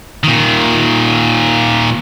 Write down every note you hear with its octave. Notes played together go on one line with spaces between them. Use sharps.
A#2 D#3